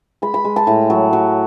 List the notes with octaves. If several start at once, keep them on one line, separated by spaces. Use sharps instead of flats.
G#3 B5
B5
G#3
A5
A2
F#3
F#3